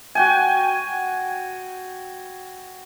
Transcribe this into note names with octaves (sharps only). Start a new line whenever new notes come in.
F#4 G5 G#5